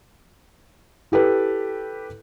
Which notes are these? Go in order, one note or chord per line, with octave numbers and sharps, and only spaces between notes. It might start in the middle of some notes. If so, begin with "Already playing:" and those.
E4 G4 A4 B4